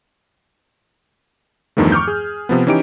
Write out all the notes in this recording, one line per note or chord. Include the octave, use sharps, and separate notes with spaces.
E2 G2 D#3 F3 A3
C#6 D6 F6 G6
G#4
C3 F3 B3
E3 C#4 D#4 G4 D7